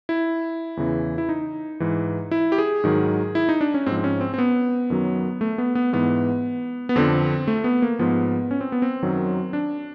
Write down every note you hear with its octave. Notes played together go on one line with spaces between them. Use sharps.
E4
E2 C#3 E3
E4
D#4
G#2 E3
E4
G4
G#4
G#2 D#3 F#3
E4
D#4
D4
C#4
G#2 F3 C4
C4
C#4
C4
C4
B3
F#2 D#3 F#3
A3
B3
B3
G#2 E3 B3
B3
F2 D3 F3 C4
A3
B3
A#3
G#2 F3 B3
C#4
C4
B3
C4
F#2 D#3 F#3
D4